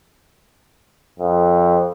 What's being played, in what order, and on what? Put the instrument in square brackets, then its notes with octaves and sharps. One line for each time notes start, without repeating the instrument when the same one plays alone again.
[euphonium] F2